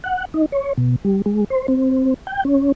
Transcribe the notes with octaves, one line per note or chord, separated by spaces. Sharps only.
F#5
D#4
C#5
B2
G3
G#3
C5
C4
G5
C#4